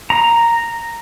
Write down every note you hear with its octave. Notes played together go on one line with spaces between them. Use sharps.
A#5